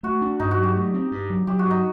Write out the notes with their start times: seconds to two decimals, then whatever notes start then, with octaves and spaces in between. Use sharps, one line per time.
0.03 A3 F#4
0.22 D4
0.40 G2 D#4
0.51 F#4
0.58 F#3
0.63 G4
0.76 A3
0.94 C4
1.11 G2
1.30 F#3
1.47 F#3 G4
1.59 F#4
1.65 G2
1.71 D#4